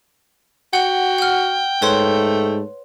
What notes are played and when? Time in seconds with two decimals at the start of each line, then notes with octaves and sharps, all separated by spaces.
0.73 F#4 F#5 G5
1.18 F#5 F6
1.82 G#2 A3 B4 C#5 C6